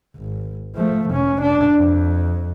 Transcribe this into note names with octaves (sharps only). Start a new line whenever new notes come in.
G#1
F3 A3
F1 C#4
D4
F2